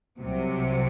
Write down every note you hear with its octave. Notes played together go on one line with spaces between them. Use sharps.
C2 C3 F#3